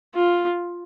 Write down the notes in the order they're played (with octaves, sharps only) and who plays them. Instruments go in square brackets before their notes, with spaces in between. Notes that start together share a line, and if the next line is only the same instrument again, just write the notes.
[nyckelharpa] F4